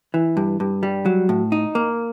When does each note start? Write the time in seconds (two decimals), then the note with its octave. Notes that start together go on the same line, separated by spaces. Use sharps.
0.14 E3
0.37 G2
0.60 G2
0.83 G3
1.06 F#3
1.29 A2
1.52 D#4
1.75 A#3